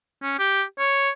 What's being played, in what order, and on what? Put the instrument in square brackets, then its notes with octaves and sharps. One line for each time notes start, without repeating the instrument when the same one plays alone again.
[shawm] C#4
G4
C#5